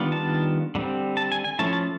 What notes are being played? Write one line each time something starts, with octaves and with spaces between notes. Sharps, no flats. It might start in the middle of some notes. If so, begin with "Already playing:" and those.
Already playing: D#3 G3 B3 D4 F4
A5
D3 G3 C4
A5
G#5
G#5
F3 A3 C#4 E4 A5
A5